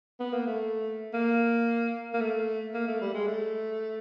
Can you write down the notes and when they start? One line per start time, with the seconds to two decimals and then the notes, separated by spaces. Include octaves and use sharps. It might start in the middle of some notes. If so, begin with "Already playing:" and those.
0.20 B3
0.33 A#3
0.47 A3
1.14 A#3
2.14 A#3
2.21 A3
2.74 A#3
2.87 A3
3.01 G3
3.14 G#3
3.28 A3